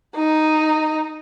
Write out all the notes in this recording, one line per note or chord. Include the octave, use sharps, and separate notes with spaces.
D#4